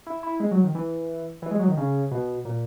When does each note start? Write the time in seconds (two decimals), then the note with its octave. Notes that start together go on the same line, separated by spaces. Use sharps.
0.07 E4
0.23 E4
0.40 G#3
0.51 F#3
0.64 D#3
0.75 E3
1.42 E3
1.51 G#3
1.59 F#3
1.68 D#3
1.77 C#3
2.11 B2
2.45 A#2